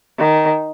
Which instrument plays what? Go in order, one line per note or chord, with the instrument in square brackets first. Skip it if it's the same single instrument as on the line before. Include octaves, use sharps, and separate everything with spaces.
[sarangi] D#3